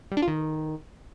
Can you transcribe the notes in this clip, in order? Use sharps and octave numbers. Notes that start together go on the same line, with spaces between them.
G3
D4
F4
D#3